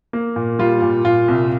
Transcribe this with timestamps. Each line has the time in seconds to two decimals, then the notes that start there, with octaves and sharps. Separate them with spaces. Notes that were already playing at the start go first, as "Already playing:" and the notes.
0.13 A#3
0.36 A#2
0.59 G3 F4
0.82 A#2
1.05 A#2 F4
1.28 C2